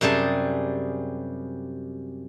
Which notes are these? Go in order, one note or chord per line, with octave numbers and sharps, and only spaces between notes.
F#2 C3 G3 G#4 A5